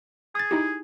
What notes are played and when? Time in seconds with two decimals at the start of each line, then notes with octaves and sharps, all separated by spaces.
0.35 G#4 D#6 A6
0.51 D#4 E4 G4